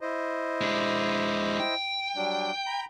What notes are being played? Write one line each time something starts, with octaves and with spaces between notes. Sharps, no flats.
E4 C5 D#5
G#3 D4
G5
F#3 G3 D4
A#5 B5